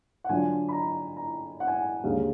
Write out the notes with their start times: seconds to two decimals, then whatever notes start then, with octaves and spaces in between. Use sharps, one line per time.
0.24 F#5
0.29 D3 F#3 D4 F4 G#5
0.68 B5
0.73 A#5
1.17 A#5
1.60 F#5
1.67 G#5
1.75 F#5
2.03 D#2 D3 G#3 F5